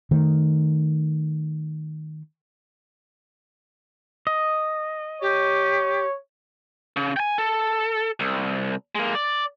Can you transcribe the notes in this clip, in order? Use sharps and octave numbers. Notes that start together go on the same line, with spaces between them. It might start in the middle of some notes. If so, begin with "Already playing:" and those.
D#3 A3
D#5
G4 C#5
C#3
G5 G#5
A4
C2
G#3 A#3
D5